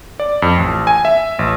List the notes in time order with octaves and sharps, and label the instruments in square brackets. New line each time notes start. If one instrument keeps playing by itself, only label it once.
[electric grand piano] D5
F2
A1
G#5
E5
A1